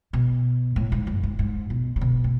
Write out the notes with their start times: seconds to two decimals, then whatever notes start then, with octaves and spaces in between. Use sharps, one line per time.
0.13 B2
0.76 A2
0.92 G#2
1.07 F#2
1.23 G#2
1.39 G#2
1.70 B2
1.96 C#3
2.01 B2
2.24 A3